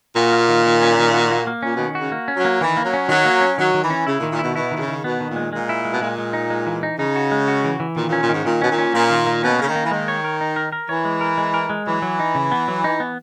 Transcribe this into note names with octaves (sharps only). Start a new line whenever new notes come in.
A#2 F#4
A#3
D#3
D#3
C#4
D#3
F#4
A#3
A#3
A#2 C#4
B2 D#3
C#3 F#4
A#3
C#4
F#3
A#3
D#3 E3
A#3
F#3
C#4
D#3 F#3
A#3
C#4
D#3 F#3
D#3
E3
C#4
C#3 E4
A#2 D#3
A#2
B2 E4
B2 E4
B2 D#3
C#3
D#3
B2 B3
D#3
A#2
G#3
A#2 G#3
E4
G#3
B2
A#2 G#3
G#3
D#4
G#3
E3
D#4
C#3 D#4
F#4
G#3
F#4
E3
E3
A#2 D#3
A#2
C#4
A#2
G#2 D#3
A#2 D#3
B2 C#4
A#2
C#4
A#2 A#3
D#3
A#3
B2 C#4
C#3 A#3
D#3
A#3
E3
D#3 G#3
C#5
A#4
D#4
A#4
A#4
E3 C#5
G#3
A#4
G#3
A#4
G#3
E3 F#3
F#3
D#4
C#3
B3
F#3
D#4
B3